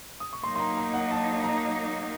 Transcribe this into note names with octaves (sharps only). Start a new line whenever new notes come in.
D#6
C#6
F#3 A#3 D#4 C6
C6
A#5
A#5
F#5
A5
A#5